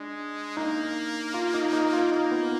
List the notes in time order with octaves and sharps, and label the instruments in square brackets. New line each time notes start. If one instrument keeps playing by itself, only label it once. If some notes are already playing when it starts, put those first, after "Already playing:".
Already playing: [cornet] G#3 [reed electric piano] D4
[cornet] A#3 [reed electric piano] D#4
[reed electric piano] F4
D#4
D#4
F4
[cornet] A#3 [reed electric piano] D#4
[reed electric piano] B3